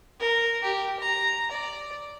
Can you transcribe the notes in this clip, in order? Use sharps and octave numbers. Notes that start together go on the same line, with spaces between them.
A#4
G4
A#5
D5